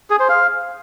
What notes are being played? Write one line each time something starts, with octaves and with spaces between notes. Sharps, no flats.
G#4
C5
F5